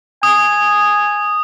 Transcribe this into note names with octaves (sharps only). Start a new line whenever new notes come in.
G#5 D#6